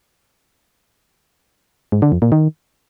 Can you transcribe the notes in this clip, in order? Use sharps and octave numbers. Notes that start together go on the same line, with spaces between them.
G#2
D3
F2
A#2
D#3